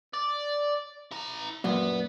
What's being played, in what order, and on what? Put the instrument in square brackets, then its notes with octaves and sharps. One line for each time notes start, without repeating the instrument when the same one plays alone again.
[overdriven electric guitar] D5
E4 A#5
[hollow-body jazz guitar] F#2 A#2 [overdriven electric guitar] B3